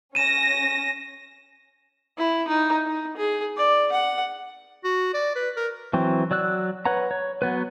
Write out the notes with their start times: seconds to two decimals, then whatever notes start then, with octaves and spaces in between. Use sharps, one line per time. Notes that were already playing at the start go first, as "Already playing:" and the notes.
0.15 C#4 A#6 D#7 E7
2.18 E4
2.48 D#4
2.86 D#4
3.17 G#4
3.57 D5
3.92 F#5
4.84 F#4
5.14 D5
5.36 B4
5.56 A#4
5.93 E3 F#3 C4
6.31 F#3 D5 E6 F#6
6.85 B4 C#5 F#5 A#5
7.11 C#5
7.42 F#3 B3 B4